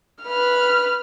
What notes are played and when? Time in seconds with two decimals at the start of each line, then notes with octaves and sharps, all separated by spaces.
0.23 B4 F6